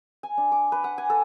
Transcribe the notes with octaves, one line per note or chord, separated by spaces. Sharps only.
G#5
D4
D6
B4
F#5
G#5
A4